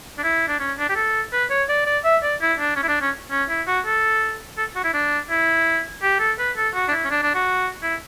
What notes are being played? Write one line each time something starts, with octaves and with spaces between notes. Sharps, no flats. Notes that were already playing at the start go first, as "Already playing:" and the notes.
D4
E4
D4
C#4
D4
G4
A4
B4
C#5
D5
D5
E5
D5
E4
D4
C#4
E4
D4
C#4
C#4
E4
F#4
A4
A4
F#4
E4
D4
E4
G4
A4
B4
A4
F#4
D4
E4
C#4
D4
D4
F#4
E4